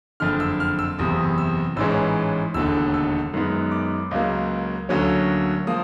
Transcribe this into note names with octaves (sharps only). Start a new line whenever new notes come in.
F#1 F2 D3 F6
E6
F6
E6
F#1 E2 C3 D#6
E6
A1 G#2 E3 G#3 C#4 E6
E1 D#2 D3 E6
E6
F#2 D#3 G#3 B3
D6
C#2 C#3 F#3 A#3
D2 D3 F#3 A#3 C#4
F3 A#3 D#6